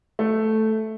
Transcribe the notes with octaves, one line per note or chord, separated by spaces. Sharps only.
A3